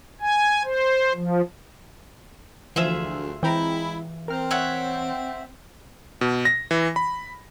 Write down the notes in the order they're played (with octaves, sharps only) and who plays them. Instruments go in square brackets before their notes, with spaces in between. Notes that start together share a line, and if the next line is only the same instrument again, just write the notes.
[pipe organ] G#5
C5
F3
[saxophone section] D2 [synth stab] E3 F3 [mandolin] F4 G#4 E5
[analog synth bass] E3 [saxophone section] G#3 E4 [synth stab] C4 G5 A#5
[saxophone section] C4 [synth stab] A#4 F6
[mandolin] C#5 E5 F#5
[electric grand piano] B2
A#6
E3
B5